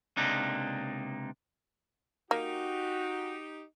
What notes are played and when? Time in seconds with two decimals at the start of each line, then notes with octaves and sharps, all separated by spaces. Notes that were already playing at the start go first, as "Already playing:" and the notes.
0.17 C#2 C3 A#3 D4 D#4
2.31 A#3 D#4 F#4 G4